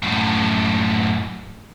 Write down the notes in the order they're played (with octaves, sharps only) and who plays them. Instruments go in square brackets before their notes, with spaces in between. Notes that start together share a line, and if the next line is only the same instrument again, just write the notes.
[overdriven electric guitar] F#2 A2